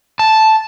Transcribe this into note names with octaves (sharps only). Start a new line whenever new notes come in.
A5